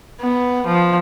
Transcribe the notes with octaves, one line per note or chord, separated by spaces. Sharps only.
B3
F3